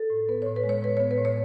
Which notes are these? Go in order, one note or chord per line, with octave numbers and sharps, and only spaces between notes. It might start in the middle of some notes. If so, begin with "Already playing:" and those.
Already playing: A4
A2
B3 B4
A2 C#5
B4
G#3
C#5
A2 B4
B3 C#5
B4
A2
C#5